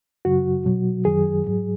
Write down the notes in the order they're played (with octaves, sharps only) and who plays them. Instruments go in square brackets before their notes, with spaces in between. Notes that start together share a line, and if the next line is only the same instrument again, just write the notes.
[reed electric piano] F#2 C#3 F#3 F#4
B2 F#3
F#2 D#3 F#3 G#4
G#2 F#3